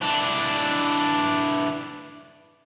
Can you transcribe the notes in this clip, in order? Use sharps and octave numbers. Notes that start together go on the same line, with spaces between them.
E3 D4